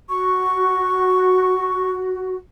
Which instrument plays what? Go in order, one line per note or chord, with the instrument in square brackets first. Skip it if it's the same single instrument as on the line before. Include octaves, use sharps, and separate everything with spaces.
[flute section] F#4 [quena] C#6